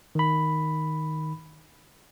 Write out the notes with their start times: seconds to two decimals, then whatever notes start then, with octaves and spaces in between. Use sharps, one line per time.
0.15 D#3 B5